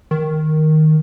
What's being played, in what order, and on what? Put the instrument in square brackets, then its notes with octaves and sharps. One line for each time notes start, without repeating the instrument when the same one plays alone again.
[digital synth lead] D#3